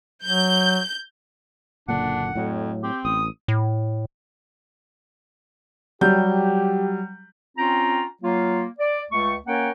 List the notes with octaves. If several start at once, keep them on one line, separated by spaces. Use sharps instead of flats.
F#3 G6
F#1 A#2 D3 D4 F#5
F2 A2 F#3
C4 G4
A1 D#6
A2
F#3 G3 G4 G6
C4 C#4 F4 G5 A#5
F#3 A#3 F4
D5
C#2 A3 C#6
A#3 C#4 A#4 C#5 F#5 G5